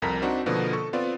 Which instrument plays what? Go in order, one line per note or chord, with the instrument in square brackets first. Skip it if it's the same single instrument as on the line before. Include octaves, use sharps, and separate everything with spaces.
[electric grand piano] C2 F2 A#4 A#5 B6
C4 D4 D#4 F#4
B2 D3 F3 A#3 B3
A4 C#6
B3 C4 F4 D5